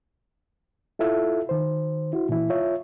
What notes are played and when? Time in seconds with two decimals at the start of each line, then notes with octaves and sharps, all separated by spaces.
0.99 E4 F4 A4 E5
1.49 D#3 C5
2.13 E4 F#4
2.29 A#2 E3 E4
2.50 F4 C#5 E5